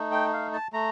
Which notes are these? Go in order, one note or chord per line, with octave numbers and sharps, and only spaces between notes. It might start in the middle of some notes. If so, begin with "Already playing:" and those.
Already playing: A3 D#4
G5
F5
A5
A3 A#5